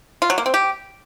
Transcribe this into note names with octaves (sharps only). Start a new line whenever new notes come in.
F4
F#3
A#3
C4
G4